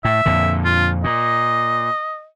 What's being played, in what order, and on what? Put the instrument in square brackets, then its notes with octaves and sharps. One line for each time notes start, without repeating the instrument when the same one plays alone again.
[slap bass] A2 [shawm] E5
[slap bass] F2 A#2 D3
[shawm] F4
[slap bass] A#2 [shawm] D#5